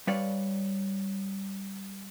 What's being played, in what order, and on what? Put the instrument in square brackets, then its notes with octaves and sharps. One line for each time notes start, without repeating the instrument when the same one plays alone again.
[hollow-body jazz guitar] G3 B4 C#5 D5 F5